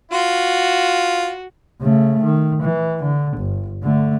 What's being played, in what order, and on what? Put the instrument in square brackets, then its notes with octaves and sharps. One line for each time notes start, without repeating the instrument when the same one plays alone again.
[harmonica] F4 [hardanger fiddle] F#4
[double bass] C#3 A3
D#3
E3
D3
G1
D3 A3